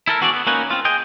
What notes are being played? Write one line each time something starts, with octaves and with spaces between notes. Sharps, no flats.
E4 A4 A#4
E3 B3 F#4 G#4 A4 D5
B3
A#3 C#4 D#4 F#4 B4 C#5
C4 F4
G#4 D#5 G5